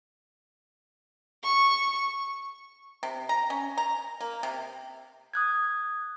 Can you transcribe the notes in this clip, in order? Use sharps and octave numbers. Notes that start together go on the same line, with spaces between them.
C#6
C3
A#5
C#4
A#5
A#3
C3
D#6 F#6 G#6